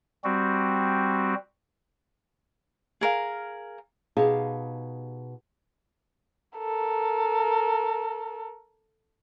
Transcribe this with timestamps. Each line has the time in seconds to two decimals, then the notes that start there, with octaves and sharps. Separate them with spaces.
0.24 G3 C4 F#4
3.01 G#4 A#4 F5
4.17 B2 D#4 G4 G#4 F5 A5
6.58 A4 A#4